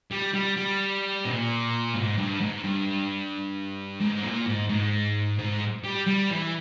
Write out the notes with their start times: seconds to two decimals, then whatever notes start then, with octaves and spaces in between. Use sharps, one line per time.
0.11 G3
0.34 G3
0.57 G3
1.25 A#2
1.95 G#2
2.17 G2
2.40 G#2
2.63 G2
4.01 G#2
4.23 A#2
4.46 G#2
4.69 G#2
5.38 G#2
5.84 G3
6.07 G3
6.30 E3